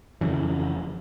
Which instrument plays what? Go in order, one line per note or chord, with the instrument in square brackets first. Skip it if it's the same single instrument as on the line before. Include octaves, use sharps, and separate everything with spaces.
[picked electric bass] F2 C#3 E3